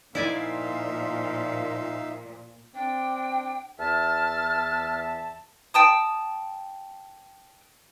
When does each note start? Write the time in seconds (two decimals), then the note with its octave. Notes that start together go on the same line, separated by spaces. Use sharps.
0.15 A#2 F3 D#4 E4 D5 E5 F5 G#5
2.75 C4 D4 G5
3.79 E2 E5 A5 F6
5.74 G5 A5 D#6